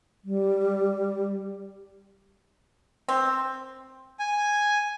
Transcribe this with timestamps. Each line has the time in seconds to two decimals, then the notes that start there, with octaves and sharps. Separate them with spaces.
0.25 G3
3.09 C4
4.19 G#5